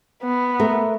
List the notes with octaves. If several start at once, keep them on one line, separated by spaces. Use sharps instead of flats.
B3
A3 A#4